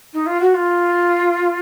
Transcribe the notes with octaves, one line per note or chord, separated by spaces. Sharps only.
D#4
F4
F#4
F4